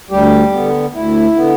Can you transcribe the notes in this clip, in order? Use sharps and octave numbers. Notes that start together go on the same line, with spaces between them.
D2 G3 G4
D3 B3
D2 E4
D3 B3